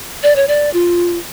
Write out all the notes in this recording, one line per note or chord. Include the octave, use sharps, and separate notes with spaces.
D5
C#5
D5
F4